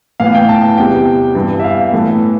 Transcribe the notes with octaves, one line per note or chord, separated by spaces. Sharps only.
A2 E3 B3 F5
G5
A5
E2 C3 G3 B3 G5
G2 E3 B3
E5
F5
A2 E3 B3 A4